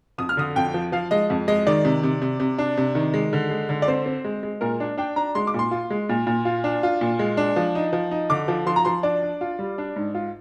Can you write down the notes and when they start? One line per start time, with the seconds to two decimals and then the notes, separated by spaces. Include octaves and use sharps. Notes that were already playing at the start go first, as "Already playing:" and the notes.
0.18 F2 D#6
0.29 F6
0.37 D3 D#6
0.56 F2 G5
0.74 F3
0.92 F3 F5
1.11 G#3 D#5
1.30 F2
1.48 G#3 D#5
1.67 D#3 D5
1.85 C3
2.03 C3
2.22 C3
2.40 C3
2.58 D4
2.77 C3
2.95 D#3
3.14 G#3
3.33 D3
3.50 G#3
3.69 D3
3.82 D5
3.88 C4 C5
4.06 C4
4.24 G#3
4.43 G#3
4.61 A#2 A#4
4.80 D4
4.98 D4 G5
5.16 D4 A#5
5.35 G#3 C6
5.47 D6
5.54 A#2 C6
5.71 F4
5.90 G#3
6.09 A#2
6.27 A#2
6.45 F4
6.64 D4
6.83 F4
7.01 A#2
7.19 G#3
7.37 D4
7.56 F3
7.75 D#4
7.93 F3
8.11 D#4
8.30 D3 D6
8.48 F3
8.66 F3 C6
8.76 A#5
8.85 F3 C6
9.03 D4 D5
9.23 D4
9.41 F4
9.59 G3
9.78 D4
9.96 G#2
10.15 F4